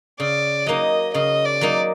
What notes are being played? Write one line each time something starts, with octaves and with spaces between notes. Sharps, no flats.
C#3 D5
F#3 A#3 D#4 D#5
C#3 D#5
D5
F#3 A#3 D#4